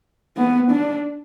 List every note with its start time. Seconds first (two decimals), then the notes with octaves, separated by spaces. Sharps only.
0.37 B3
0.71 D4